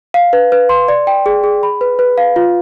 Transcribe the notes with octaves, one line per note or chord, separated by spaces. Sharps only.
F5
B4
B4
C6
D5
G5
G#4
G#4
B5
B4
B4
F5
F4